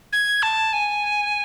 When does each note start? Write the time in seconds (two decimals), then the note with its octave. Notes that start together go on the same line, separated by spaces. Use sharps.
0.13 G#6
0.43 A5
0.73 G#5